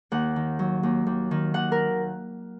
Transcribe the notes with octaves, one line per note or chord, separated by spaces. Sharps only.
D#2 F#5
D#3
F#3
D#2
D#2
D#3
D#2 F#5
A#4